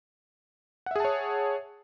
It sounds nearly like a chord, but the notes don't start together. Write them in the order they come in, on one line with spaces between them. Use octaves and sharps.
F#5 E5 G#4 A5 C#5